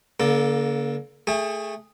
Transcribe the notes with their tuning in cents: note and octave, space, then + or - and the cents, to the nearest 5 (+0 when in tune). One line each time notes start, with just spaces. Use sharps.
D3 -45 A#3 +20 A4 +0
A3 +5 G#4 +0 G5 +40